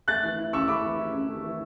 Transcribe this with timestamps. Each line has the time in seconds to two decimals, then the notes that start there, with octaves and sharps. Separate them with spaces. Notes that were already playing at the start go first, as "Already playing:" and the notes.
0.08 A3 F#6 A6
0.23 E3
0.38 E4
0.53 C#4 C#6 E6
0.68 A3 B5 D6
0.83 E3
0.99 E4
1.13 C#4
1.29 A3
1.44 E3